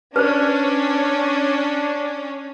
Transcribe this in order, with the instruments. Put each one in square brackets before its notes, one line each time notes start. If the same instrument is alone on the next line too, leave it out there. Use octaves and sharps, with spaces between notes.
[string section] C#4 [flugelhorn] D4 [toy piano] B4 C5